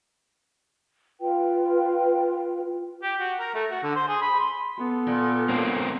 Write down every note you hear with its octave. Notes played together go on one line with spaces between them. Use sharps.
F4 B4 G5
G4
F#4
A#4
A3
F#4
D3
C5
G#4
B5
C6
B3 A4
A#2
A#3 C4